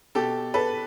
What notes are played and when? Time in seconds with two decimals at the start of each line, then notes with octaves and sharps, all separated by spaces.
0.15 B2 G4 A4
0.54 A4 B4